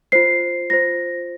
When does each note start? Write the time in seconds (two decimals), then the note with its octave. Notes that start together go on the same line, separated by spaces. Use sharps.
0.12 F4 C5 C7
0.70 F4 C5 A#6